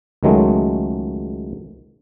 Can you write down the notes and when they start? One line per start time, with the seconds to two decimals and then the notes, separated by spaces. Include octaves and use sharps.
0.23 C#2 D#3 F#3 G#3 A3